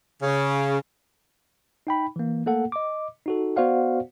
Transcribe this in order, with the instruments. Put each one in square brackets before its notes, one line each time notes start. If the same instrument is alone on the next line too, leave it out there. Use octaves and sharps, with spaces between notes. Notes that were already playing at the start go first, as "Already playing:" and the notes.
[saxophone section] C#3
[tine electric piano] D#4 G5 B5
E3 A#3
A3 A#3 A4 F#5
D#5 D6
D#4 F#4 A4
B3 F#4 C5 D5 F5 F#5